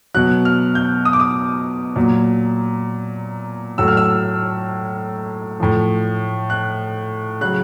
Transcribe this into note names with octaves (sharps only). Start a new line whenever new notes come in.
B2 F#3 F#6
F6
G6
D#6
D6
D#6
A#2 F#3
A2 F#3 E6
F6
E6
A2 F3
F#6
C#3 F#3 F#6